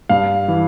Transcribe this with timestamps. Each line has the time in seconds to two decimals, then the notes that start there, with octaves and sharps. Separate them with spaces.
0.09 G2 F5
0.48 E3